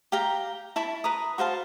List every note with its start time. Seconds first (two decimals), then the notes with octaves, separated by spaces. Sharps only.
0.12 G4 F5 G5 A#5
0.76 E4 A5 B5 C#6
1.04 B4 A#5 D#6
1.38 F#4 C5 F5 A5